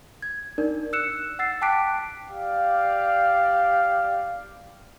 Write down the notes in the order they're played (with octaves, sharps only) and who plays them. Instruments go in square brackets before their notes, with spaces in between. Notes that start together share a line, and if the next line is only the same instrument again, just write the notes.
[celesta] G#6
D4 D#4 A#4 D5
E6 F#6 C#7 E7
F#5 E6 A6 C7
G5 A5 D6 F#6 B6 D7
[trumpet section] G4 D5 F5